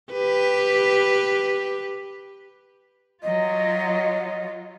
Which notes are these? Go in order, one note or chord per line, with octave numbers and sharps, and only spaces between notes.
G4 B4
F#3 F4 D#5